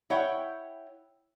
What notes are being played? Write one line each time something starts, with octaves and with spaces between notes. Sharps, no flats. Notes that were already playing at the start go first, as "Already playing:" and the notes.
E4 C#5 F#5 G5